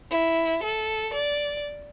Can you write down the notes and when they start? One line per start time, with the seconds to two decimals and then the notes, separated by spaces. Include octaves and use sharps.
0.11 E4
0.63 A4
1.13 D5